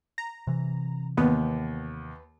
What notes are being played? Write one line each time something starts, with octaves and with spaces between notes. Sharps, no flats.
A#5
C3 E3
D#2 B3